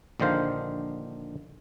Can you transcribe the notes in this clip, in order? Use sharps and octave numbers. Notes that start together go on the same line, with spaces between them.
A#1 D3 D#3 C5 F5